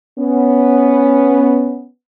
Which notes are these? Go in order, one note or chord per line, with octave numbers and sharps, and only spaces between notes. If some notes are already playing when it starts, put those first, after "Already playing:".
B3 C#4